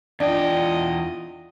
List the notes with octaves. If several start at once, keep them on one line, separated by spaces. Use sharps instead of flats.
E2 D4 F4 D5 D#5 G5